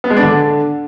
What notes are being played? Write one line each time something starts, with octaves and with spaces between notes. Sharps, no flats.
B3
G#3
D4
D3